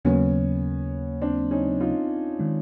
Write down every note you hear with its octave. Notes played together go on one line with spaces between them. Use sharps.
D#2 C#3 F#3 A#3 B3 C#4
C4 D4
C#4 D#4
D#4 F4
D#3 G#3